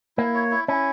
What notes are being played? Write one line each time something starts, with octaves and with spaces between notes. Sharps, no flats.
A#3 E4
C#5
E4
C#4 E4